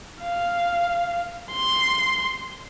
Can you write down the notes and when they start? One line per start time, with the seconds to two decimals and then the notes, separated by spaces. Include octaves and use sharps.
0.23 F5
1.53 C6